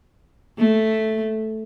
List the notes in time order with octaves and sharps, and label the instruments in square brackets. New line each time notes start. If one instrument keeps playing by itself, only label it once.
[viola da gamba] A3